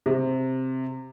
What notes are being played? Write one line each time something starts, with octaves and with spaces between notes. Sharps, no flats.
C3